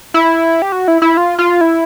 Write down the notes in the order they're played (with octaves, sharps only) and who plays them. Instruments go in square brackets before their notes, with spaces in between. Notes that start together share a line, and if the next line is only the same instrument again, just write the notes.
[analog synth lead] E4
G4
F#4
E4
E4
F4
F4
E4